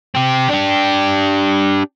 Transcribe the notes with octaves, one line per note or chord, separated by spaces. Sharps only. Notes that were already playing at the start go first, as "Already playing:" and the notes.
C4 G4
D4 G4